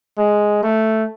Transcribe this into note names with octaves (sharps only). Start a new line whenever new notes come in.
G#3
A3